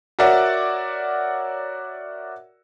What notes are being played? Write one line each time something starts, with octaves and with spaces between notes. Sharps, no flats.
F#4 A#4 C#5 D5 E5 F#5